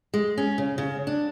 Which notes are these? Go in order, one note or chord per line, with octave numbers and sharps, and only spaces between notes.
G#3
C#4
C#3
C#3
D4